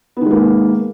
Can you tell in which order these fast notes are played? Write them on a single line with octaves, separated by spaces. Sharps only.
B3 D#3 G#3 A#3